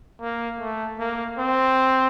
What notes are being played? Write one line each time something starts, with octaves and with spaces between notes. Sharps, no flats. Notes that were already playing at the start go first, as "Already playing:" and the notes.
A#3
A3
A#3
C4